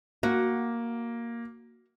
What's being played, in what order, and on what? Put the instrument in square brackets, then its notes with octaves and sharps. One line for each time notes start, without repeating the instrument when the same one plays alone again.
[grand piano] A#3 [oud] F#4